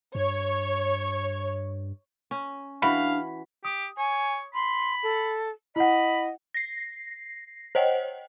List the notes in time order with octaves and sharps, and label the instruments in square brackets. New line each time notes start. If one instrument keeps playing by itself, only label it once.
[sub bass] G2 [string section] C#5
[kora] C#4
[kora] E3 F#4 [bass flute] D4 [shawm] F5 [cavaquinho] B5
[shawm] G4 [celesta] D#6
[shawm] C#5 [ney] G#5
[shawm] B5 [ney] C6
[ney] A4
[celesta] E4 F#5 [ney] D#5 [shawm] B5
[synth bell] A#6 C7
C5 C#5 D#5 F#5 G5